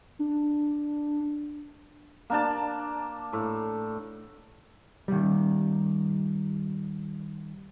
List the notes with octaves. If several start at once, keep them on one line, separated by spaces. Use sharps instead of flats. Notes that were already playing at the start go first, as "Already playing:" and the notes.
D4
A#3 D4 A5
A2
D#3 G3